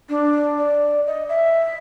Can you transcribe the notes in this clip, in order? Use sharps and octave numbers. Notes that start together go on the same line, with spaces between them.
D4
D5
D#5
E5